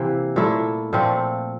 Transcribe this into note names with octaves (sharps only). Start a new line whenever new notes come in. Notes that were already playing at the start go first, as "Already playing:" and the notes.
Already playing: C3 E3 A#3
A#2 A3 E4
A#2 F3 A3 C4